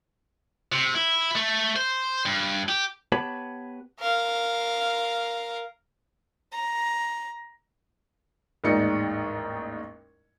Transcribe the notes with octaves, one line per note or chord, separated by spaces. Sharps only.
C3
E4
A3
C5
G2
G4
B3 G4 B4 C#5 A5 B5
A#4 F5
A#5
A1 D#2 G#2 D#4 D5 C#7